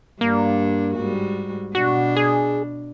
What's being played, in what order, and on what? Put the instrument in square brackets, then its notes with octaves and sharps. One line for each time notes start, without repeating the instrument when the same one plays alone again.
[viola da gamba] G2 D4 [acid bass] A#3
[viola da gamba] G#2 G3 F#4
[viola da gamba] B2 D4 [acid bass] F#4
[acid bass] G#4